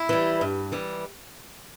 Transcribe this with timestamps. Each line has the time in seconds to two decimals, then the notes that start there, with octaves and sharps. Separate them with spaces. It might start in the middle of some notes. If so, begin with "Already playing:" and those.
Already playing: E4
0.09 E3 G3
0.41 G2
0.72 E3 G3